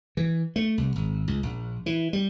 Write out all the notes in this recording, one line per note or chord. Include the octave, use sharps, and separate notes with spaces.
E3
A3
C2
G#1
C#2
A#1
E3
G3